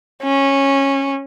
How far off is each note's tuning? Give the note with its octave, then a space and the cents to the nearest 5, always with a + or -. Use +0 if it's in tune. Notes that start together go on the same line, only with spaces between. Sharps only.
C#4 -15